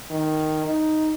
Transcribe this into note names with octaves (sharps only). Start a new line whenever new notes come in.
D#3
D#4